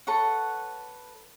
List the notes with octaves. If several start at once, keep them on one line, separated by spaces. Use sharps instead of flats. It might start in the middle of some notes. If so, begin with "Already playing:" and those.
A4 B4 C#5 F#5